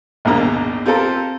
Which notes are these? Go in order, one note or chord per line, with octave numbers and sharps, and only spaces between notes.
A#1 D#2 G#2 B2 A#3 A#5
C4 F4 G4 A4 A#4 C5